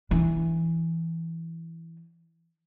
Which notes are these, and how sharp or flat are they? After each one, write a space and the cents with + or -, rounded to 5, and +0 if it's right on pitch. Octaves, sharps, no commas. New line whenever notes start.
E3 +0 D4 -20